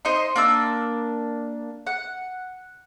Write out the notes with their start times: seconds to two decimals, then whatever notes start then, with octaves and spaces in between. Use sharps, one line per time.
0.05 D#4 C5 D#5 C6
0.36 A#3 D4 E6
1.87 F#5